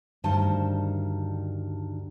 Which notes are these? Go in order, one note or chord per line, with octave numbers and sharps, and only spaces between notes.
D2 G2 D#3 C5 A5